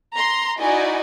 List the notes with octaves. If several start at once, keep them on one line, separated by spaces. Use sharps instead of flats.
A#5 C6
D#4 E4 F#4 D5 D#5 G#5